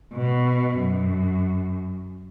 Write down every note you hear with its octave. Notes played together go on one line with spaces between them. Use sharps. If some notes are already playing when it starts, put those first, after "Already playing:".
B2
F#2